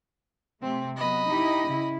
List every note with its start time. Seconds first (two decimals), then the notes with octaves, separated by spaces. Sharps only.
0.62 C3 A3 C4
0.96 F#3 B3 D#5 B5
1.27 D#4 E4 G4
1.67 C#3 E4